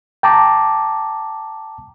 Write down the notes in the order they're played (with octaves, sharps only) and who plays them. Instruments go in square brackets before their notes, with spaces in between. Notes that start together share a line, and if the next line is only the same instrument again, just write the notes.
[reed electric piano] G5 A5 A#5 D6